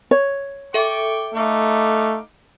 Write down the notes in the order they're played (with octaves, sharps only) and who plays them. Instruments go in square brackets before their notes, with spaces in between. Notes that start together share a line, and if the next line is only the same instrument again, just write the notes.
[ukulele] C#5
[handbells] A4 E5 [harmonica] G5 C#6 D6
[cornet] A3 [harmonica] D#4 F5 D6